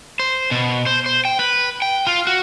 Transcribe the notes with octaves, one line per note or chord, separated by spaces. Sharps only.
C5
B2
C5
C5
G5
B4
G5
F4
F#4